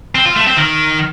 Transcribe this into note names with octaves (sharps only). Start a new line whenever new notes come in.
C4
F4
A3
C4
D#3